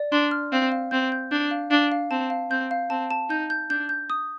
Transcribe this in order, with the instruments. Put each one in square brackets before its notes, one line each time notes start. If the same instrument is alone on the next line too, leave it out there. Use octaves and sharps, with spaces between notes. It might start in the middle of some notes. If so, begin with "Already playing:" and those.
Already playing: [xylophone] D5
[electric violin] D4 [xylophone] C6
[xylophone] F6
[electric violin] C4 [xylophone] F5
[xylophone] F5
[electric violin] C4 [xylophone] G6
[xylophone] G6
[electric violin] D4 [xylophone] G6
[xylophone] F5
[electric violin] D4 [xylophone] F5
[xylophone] F5
[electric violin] C4 [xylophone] A5
[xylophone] F5
[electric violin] C4 [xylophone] G6
[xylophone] F5
[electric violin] C4 [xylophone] A5
[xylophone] A5
[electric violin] D#4 [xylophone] G6
[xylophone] G6
[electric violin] D4 [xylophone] G6
[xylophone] G6
D#6